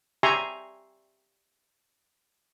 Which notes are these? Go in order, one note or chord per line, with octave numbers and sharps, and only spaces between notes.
G4 E5 G#5 A#5 C6 C#6